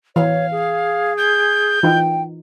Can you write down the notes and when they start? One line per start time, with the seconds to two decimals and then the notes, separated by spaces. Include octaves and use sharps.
0.16 E3 C#5 F5
0.51 G#4
1.18 G6
1.83 E3 D#4 F4 G5